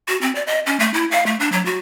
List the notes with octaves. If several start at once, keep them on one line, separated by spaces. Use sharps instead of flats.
F#4
C4
D5
D#5
C#4
A3
E4
F5
A3
D4
F#3
F#4